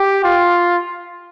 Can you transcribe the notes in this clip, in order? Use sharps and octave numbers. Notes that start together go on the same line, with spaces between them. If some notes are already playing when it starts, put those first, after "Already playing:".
Already playing: G4
F4